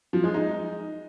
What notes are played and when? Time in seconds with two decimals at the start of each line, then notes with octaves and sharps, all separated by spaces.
0.13 F3
0.24 G#3
0.34 D#4